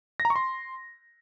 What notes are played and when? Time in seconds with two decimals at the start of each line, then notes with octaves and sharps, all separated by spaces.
0.20 A#6
0.25 A#5
0.30 C#6
0.36 C6